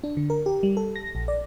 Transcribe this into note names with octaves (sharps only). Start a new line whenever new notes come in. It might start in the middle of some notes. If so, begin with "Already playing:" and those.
D4
D3
A#4
G4
G3
A4
A#6
A#1
D5